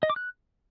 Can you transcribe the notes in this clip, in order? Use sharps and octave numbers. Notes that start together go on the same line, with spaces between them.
D#5
D6
F#6